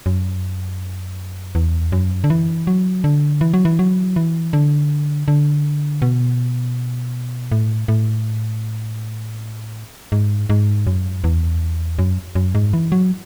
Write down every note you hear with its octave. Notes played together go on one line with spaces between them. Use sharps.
F#2
E2
F#2
D3
E3
F#3
D3
E3
F#3
E3
F#3
E3
D3
D3
B2
A2
A2
G#2
G#2
F#2
E2
F#2
F#2
G#2
E3
F#3